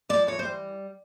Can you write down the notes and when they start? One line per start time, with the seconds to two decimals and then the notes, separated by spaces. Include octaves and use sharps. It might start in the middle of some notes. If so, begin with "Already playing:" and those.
0.09 F3 D5
0.27 E3 C#5
0.39 C5
0.45 G3